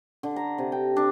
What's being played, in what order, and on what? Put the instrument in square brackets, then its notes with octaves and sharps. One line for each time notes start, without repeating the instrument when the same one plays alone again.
[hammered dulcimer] D3
A#5
C3
G5
D4